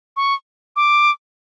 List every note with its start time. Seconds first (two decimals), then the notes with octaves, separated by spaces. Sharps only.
0.17 C#6
0.76 D6